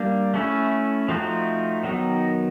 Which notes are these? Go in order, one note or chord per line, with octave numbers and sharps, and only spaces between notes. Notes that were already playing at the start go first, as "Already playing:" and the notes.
Already playing: G3 A#3 D4
A3 C#4 E4
F3 A3 C4 D#4 F#4
D#3 F#3 B3 D#4